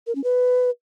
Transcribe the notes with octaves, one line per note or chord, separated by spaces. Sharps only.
A#4
C#4
B4